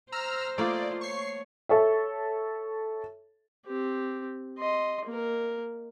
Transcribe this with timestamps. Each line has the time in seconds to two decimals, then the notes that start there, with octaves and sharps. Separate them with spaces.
0.12 C5 A#5 E6 F6
0.58 A3 A#3 F4 D5 D#5
1.01 C#5 C#6 C7
1.69 A4 C#5 E5
3.66 C4 G4
4.59 D#5 C6
5.05 A#3 A#4